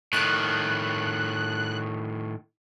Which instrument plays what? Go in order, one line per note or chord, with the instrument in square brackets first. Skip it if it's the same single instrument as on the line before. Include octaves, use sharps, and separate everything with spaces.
[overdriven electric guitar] A2 D#3 [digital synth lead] F#6